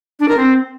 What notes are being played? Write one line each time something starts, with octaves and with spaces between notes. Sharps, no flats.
D4
A#4
C4